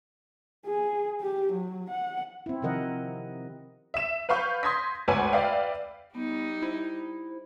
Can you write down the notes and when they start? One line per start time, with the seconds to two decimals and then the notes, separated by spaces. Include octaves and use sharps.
0.66 G#4
1.21 G4
1.53 F#3
1.90 F#5
2.46 C4 E4
2.62 C3 D#3 F3 A#4 D#5 F#5
3.94 E5 E7
4.29 B4 F5 B5 C#6 G6
4.63 C6 D#6 G#6 A#6 B6
5.08 G#1 D2 B4 C#5 G#5
5.32 B4 D5 E5 F5 G5
6.15 G3 B3 D#4
6.62 E4 C5